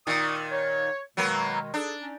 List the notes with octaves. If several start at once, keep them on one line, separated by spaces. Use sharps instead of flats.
A#2 D#3 D5 C#6 D#6
C#5
B2 D#3 F#3 G#3 A#3 B3
D4 G#4 A4
C#4 D#4